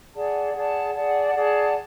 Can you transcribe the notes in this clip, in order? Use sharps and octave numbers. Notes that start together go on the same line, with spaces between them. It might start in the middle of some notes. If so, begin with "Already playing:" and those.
G#4 D5 F#5 A5
G#4 D5 F#5 A5
G#4 D5 F#5 A5
G#4 D5 F#5 A5